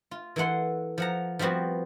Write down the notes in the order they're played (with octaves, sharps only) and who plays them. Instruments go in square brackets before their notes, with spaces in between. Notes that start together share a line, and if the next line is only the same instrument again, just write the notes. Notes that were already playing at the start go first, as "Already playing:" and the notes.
[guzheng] F4
E3 A#3 A4 F#5 C6
F3 F#5 A#5
F3 G3 B3 C4 F#4